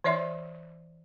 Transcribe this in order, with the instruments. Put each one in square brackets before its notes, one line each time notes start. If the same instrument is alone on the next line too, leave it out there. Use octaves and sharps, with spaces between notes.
[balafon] E3 C#5 D5 E5 C6